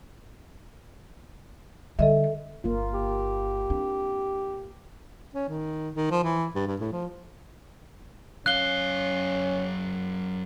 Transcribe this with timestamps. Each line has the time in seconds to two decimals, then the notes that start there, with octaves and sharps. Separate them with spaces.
1.99 D3 G3 A4 D#5 E5
2.64 G1 A#3 F4
2.94 G4
3.70 C4 D4
5.34 C#4
5.49 D#3
5.95 D#3
6.11 F3
6.24 E3
6.55 G2
6.67 G2
6.80 A2
6.92 F3
8.46 F#2 C#4 F5 F#6 G7